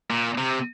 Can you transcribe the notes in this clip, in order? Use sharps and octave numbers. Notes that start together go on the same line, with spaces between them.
A#2
C3